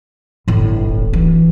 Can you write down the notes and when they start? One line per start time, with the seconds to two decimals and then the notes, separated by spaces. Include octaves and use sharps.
0.48 G1 A2 D3
0.88 D1
1.13 E3